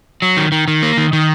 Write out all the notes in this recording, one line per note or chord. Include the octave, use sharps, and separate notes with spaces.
F#3
D#3
D#3
D#3
A#3
D#3
D#3